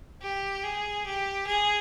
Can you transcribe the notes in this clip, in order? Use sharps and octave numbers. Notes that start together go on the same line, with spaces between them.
G4
G#4
G4
G#4